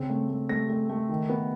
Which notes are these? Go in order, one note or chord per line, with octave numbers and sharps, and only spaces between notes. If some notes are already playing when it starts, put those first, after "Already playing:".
Already playing: C#3 C4
A3
A3
A3 A#6
A3
A3
D#3
B3